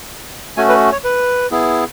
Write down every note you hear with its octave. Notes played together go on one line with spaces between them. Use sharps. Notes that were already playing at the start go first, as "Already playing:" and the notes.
A3 C#4 F#4 G#5
B4
C#5
B4
B3 E4 G#4